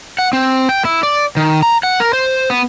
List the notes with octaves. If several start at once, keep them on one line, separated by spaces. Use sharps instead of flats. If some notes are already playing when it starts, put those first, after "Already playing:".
F#5
C4
G5
E4
D5
D#3
A#5
F#5
A#4
C5
B3